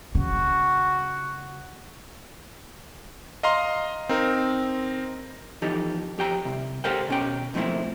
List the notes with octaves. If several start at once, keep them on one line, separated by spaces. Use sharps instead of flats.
C#3 F#4
D#5 F5 A#5 C6
C4 D#4 A#4
F2 E3 D#4 G4 A4
F2 G4 G5 A#5
C2 G#2 C3
G4 A4 A#4 C5 F5 G5
B2 C#4 G5
B1 F3 A3 A#3 C4 E4